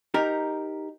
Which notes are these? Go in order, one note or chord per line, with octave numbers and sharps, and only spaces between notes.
D#4 G4 A#4